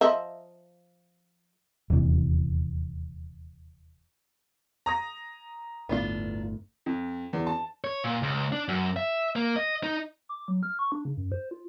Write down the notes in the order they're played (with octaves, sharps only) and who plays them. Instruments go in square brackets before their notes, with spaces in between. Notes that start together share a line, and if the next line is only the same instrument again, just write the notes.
[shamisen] F3 D#5 E5
[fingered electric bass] D#1 E2 C3 E3
[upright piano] A#5 D#6 A#6
[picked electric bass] G1 D2 A2 [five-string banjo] B3 D4 F4
[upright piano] F2
E2
A5
[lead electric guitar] C#5
A#2
C#2
D4
F#2
E5
A#3
D#5
D#4
[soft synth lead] D6
F#3
F6
C#6
D4
C#3
F#2
C5
F4